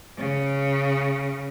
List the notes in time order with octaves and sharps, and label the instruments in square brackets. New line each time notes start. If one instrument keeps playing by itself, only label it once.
[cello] C#3